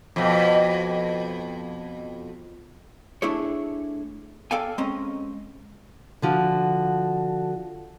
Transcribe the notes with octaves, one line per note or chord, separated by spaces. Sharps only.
F2 B2
A3 D4 E4 G#4 C#5
A4 D5 F5 G5 G#5
G#3 C4 C#4 D#5 A#5
D3 F3 F#4